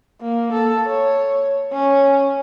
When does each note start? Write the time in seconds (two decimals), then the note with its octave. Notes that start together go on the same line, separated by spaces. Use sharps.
0.21 A#3
0.53 A4
0.87 C#5
1.73 C#4